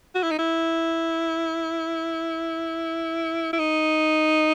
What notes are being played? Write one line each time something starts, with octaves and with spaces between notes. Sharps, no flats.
F#4
E4
D#4
E4
E4
D#4